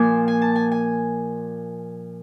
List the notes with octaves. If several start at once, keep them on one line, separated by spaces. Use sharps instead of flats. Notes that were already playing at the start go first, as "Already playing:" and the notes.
Already playing: A#2 F3 A#3 G#5
G#5
A5
G#5
G#5